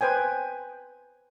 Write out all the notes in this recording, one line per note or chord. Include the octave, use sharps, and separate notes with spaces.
B4 C5 G5 G#5